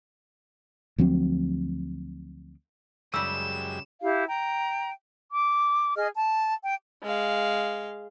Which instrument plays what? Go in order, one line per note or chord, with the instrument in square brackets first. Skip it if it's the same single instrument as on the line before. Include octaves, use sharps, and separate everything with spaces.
[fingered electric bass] D2 F3 F#3 C4
[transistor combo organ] F#2 G#3 G4 [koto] C#3 G3 [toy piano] E6 [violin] E7
[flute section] E4 G4 F5
G5 A#5
D6
G#4 D#5 F6
A5
G5
[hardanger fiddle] G#3 F5